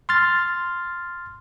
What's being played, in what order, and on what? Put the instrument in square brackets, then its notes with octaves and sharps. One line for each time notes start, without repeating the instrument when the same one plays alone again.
[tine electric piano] C6 F6 A6